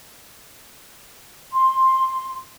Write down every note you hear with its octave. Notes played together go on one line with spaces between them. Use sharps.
C6